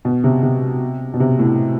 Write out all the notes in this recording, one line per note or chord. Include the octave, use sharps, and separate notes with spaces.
B2
C3
C3
B2
C3
A2